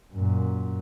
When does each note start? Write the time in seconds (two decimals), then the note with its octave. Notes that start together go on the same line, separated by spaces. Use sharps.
0.13 F#2 A#2